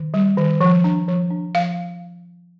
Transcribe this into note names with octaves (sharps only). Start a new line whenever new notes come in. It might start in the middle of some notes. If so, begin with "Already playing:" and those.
Already playing: D#3
G3
D#3
F3
D4
F3
D4
F3 F5